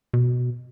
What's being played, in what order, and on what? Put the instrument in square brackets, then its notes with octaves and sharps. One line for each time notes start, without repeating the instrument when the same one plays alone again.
[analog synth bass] B2